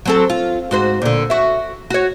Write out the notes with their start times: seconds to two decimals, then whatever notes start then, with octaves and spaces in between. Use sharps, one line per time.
0.05 F#3 C4 A4
0.30 F4
0.71 G#2 F#4 C5
1.02 A#2 D3
1.30 F#4 E5
1.90 F#4 C#5